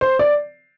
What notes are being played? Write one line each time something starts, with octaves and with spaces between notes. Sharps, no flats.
C5
D5